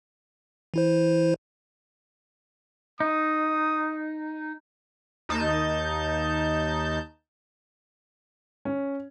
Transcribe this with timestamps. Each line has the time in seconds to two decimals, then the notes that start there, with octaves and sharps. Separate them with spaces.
0.74 E3 E4 C5
3.00 D#4 D#6
5.29 D#2 D#4 A5 G6
8.65 C#4